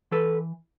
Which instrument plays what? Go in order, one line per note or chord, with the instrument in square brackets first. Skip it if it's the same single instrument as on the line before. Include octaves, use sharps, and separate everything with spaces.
[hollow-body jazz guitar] E3 A4 B4